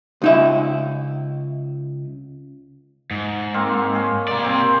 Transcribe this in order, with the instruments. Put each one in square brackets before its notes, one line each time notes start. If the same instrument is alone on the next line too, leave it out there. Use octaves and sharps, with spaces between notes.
[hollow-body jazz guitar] C#2 D#4 E5
[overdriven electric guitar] G#2
[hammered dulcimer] A#3 C4 F5
G#4 C#5
[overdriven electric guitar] C3 D5 [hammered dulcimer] A#3
[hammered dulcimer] C4 C5